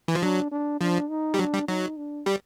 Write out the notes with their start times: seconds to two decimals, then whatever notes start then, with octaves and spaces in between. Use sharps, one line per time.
0.08 E3
0.15 F3
0.22 F#3 D4
0.52 D4
0.80 F3 D4
1.10 D#4
1.34 G3
1.39 F#3 D4
1.54 G3
1.68 F#3 D#4
1.97 D4
2.26 G3